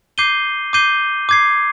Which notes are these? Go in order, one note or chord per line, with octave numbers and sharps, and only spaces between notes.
D6 G6 C7 D#7 G7
D6 G6 C7 D#7 G7
D6 G#6 C7